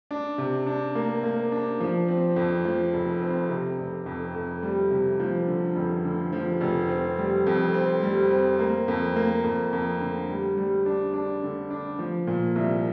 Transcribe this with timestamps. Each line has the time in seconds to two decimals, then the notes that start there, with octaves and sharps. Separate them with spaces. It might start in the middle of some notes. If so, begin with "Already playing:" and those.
0.11 D4
0.38 C3
0.66 D4
0.95 A#3
1.23 A#3
1.52 D4
1.80 F3
2.08 C4
2.36 F2
2.65 F3
2.93 F1
3.22 C4
3.49 C3
3.79 F1
4.06 F2
4.35 F2
4.63 G3
4.91 C3
5.20 F3
5.47 D3
5.76 F1
6.05 D3
6.33 F3
6.61 F1
6.89 C4
7.18 G3
7.47 F2
7.74 C4
8.03 G3
8.31 C4
8.59 A#3
8.88 F2
9.16 A#3
9.44 F2
9.73 F2
10.01 D3
10.29 G3
10.57 G3
10.86 D4
11.14 D4
11.43 D3
11.70 D4
11.99 F3
12.27 A#2
12.56 C2